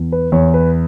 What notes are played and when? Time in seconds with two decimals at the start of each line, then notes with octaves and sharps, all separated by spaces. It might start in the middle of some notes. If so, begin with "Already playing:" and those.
Already playing: E2
0.12 B4
0.32 E2 C#5
0.54 B4